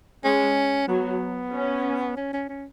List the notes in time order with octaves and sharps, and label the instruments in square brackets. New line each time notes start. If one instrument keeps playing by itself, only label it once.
[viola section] G#3 [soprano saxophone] C#4
[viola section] F#3 [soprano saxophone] B3
[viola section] C#4
[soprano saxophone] C#4
C#4
C#4